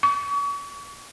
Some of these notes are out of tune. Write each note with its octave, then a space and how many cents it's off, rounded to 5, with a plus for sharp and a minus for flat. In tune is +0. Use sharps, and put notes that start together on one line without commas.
C#6 +40